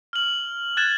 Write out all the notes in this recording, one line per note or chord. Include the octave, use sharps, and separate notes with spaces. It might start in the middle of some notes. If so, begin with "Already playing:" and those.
F6 F#7
F#6 G#6 A6 E7 F#7